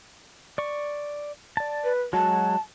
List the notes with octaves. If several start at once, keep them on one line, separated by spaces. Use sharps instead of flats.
D5 C#6
D5 A5
B4
F#3 G#3 F#4 A5